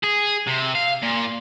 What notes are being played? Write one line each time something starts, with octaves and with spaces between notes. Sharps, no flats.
G#4
C3
F5
A#2